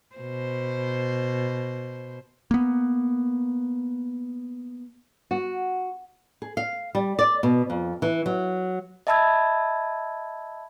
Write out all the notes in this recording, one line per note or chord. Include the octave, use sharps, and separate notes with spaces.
B2 C5
A#3 B3
F#4
G#4
F5
G3
D5
B2
F2
E3
F#3
D#5 E5 A5 B5 E6 G#6